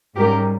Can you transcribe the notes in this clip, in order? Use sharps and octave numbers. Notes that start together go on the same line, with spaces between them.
G#2 G3 C#4 G4 A#4